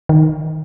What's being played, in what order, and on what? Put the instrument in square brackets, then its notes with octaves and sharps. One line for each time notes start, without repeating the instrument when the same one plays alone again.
[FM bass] D#3